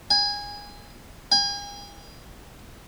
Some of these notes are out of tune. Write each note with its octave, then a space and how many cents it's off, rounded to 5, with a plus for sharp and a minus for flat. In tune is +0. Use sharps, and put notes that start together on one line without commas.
G#5 -20
G#5 -40